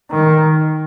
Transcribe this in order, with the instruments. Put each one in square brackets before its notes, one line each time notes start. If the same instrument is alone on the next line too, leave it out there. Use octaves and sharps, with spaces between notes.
[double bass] D#3